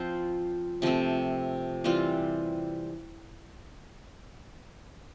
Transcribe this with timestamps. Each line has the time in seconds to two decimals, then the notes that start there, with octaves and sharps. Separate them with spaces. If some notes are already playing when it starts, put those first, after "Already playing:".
Already playing: F3 C4 F4 C5
0.82 C3 F3 A3 C4
1.84 E3 G3 C4 F4